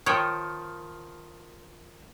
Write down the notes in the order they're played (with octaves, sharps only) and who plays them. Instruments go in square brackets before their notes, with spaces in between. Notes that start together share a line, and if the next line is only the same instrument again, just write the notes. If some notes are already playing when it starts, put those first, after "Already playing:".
[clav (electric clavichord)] D#3 F3 [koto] C#5 G5